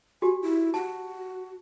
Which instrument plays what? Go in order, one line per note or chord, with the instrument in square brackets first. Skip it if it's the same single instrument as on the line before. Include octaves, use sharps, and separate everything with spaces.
[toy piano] F#4 G4 [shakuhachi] G#5
[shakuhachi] E4
[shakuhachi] F#4 [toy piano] A5